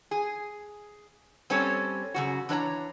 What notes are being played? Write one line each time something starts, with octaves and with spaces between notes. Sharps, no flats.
G#4
G3 C4 C#4 A4 C#5
F#2 C#3 F#4
E3 D4 C#5 E5 A#5